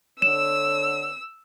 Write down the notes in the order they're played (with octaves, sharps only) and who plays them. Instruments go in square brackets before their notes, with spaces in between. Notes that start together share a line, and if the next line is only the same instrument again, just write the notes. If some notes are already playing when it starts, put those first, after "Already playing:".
[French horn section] D3 C#5 [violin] E6 [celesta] E7